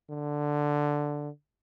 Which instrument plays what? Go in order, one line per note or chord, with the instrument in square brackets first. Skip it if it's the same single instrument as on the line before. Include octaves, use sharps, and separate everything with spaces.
[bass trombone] D3